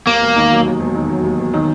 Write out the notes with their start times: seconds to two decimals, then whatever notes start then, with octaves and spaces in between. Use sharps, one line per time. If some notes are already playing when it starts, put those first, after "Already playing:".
0.07 D#2 A#3
0.21 E1
0.36 D#3
0.51 F#3
0.66 D#2
0.80 E1
0.95 D#3
1.10 F#3
1.24 D#2
1.39 E1
1.54 D#3